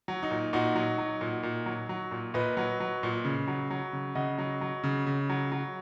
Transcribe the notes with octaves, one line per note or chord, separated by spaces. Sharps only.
F#3
D#4
A#2
A#2 D#4 F#4
F#3
F#3
A#2
A#2
F#3
F#3
A#2
A#2 B4 D#5
F#3
F#3
A#2
C#3
F#3
F#3
C#3
C#3 D#5 F#5
F#3
F#3
C#3
C#3
F#3
F#3